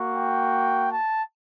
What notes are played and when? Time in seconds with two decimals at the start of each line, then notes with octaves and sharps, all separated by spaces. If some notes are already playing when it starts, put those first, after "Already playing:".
Already playing: A#3 F#4
0.16 G5
0.90 A5